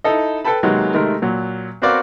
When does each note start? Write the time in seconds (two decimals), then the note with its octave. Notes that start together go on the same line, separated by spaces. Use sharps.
0.04 D#4 E4 A4 D#5
0.45 A4 B4 G5 A5 B5
0.63 C3 D#3 F#3 G#3 A#3 B3
0.94 C3 D#3 G#3 A3 A#4
1.22 A#2 F#3
1.82 B3 C4 F#4 A#4 D5 F5